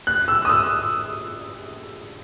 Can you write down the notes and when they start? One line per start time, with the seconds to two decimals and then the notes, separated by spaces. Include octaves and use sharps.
0.07 F#6
0.28 E6
0.45 D#6
0.49 E6